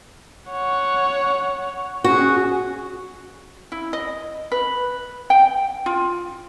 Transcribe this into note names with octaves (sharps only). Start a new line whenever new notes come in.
C#5 F#5
C#4 F#4 G#4
E4
D#5
B4
G5
F4